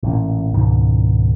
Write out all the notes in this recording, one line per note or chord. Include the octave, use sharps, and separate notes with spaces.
A1 A#2
C#2 G#2 B2 D#3